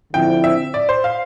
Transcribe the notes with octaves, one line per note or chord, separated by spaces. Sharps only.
D3 F3 C4 E4 G5
E5
D5
C5
F5